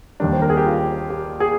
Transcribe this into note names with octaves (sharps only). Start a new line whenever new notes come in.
D#2 D#3 G3 D4
C5
A#4
G#4
G4
F4
G4
G#4